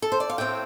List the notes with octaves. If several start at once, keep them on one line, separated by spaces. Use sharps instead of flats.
A4
C5
D5
F5
A2 A3 C4 G5